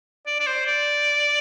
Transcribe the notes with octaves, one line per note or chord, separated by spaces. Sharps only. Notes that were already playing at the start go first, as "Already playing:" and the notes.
D5
D5
C5
D5